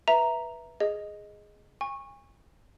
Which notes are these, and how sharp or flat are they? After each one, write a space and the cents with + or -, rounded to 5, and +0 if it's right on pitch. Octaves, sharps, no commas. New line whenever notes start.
B4 -15 E5 +0 A#5 +0
G#4 +0 D#5 +0
G#5 -40 C#6 -15